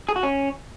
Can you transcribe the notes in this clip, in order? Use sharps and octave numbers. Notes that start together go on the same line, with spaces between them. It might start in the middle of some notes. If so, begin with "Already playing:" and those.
G#4
F#4
C#4